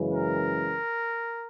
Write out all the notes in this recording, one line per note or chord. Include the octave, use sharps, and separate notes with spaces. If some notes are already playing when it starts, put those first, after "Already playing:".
Already playing: F#2 C#3 E3 G#3
A#4